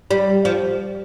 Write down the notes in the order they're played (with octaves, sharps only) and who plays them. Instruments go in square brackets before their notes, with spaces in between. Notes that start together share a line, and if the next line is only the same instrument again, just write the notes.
[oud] G3
F3